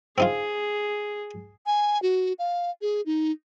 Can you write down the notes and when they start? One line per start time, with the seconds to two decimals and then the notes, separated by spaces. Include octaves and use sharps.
0.18 C4 D#4 F4 G#4
1.66 G#5
2.02 F#4
2.39 F5
2.82 G#4
3.06 D#4